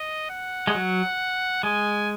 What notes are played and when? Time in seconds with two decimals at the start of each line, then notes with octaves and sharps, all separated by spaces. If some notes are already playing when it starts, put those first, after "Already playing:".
Already playing: D#5
0.30 F#5
0.67 G#3
0.75 F#3
1.63 G#3 G#5